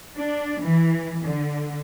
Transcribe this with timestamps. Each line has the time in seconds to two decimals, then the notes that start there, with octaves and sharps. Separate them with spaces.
0.17 D4
0.62 E3
1.25 D3